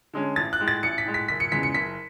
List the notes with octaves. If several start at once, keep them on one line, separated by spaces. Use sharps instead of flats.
D3 G#3 C#4
A1 A6
F#6
A2 G#3
A6
A1 C#7
B6
A2 G#3
B6
F#1 B6
C#7
E2 C#3 G#3 B6
C#7
F#1 B6